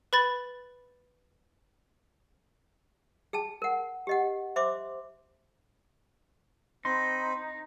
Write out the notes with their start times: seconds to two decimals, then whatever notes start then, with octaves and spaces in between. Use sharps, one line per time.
0.13 B4 B5 A6
3.33 G#4 G5 A5
3.62 A#4 F#5
4.07 G4 D#5 F#5
4.56 C5 E5 C6 D6
6.85 C4 D#4 B5 C6